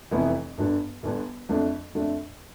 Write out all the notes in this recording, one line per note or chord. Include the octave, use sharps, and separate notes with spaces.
F1 F2 E3 B3 E4
G1 G2 D3
G1 G2 D3
F2 D3 A3 D4
F2 D3 A3 D4